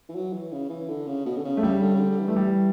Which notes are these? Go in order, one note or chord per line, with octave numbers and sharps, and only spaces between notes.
E3
F#3
E3
C#3
E3
D3
C#3
B2
D3
C#3
A3
C#3 G3
D3
C#3
D3
D3
E3
A3
G3